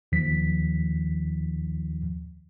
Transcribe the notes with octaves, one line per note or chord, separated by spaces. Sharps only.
D#2 D#3 F3 B6